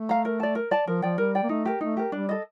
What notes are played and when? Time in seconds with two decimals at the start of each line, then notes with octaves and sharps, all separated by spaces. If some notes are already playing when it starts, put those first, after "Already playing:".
Already playing: A3
0.09 F5 A#5
0.25 A#4
0.40 D5 A5
0.55 A#4
0.71 D5 A5
0.87 F3 A#4
1.02 F3 D5 G5
1.18 G3 A#4
1.35 D5 G5
1.43 A#3
1.49 A3 D#4
1.65 G4 A#4
1.81 A3 D#4
1.97 G4 A#4
2.12 G3 D4
2.29 A4 D#5